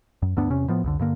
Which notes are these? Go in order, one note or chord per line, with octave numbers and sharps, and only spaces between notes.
F#2
D2 G2 B3 D4
E2 C3 C#4
A2 F3 B3
C2 F2 D3
G2 D3 A#3